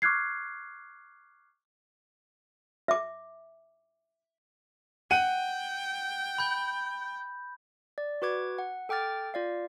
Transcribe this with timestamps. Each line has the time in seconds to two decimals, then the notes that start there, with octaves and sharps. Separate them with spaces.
0.02 C#6 D6 F6 F#6 G#6 C7
2.88 E5 D6
5.11 F#5 G5 D#7
6.38 B5 G6
7.98 D5
8.22 F#4 B4 D6 G#6
8.59 F#5
8.89 A4 G5 D6 F6 A6
9.34 F4 D5 F5